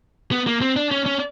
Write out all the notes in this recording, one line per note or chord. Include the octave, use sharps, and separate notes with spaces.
B3
A#3
C4
D4
C#4
C#4